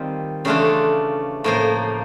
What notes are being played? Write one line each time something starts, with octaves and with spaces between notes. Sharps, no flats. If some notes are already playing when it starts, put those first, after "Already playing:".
Already playing: D#3 G3 C4 F4
C#3 E3 A3 D4 F4
A2 F3 A#3